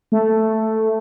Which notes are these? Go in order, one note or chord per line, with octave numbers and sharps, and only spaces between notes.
A3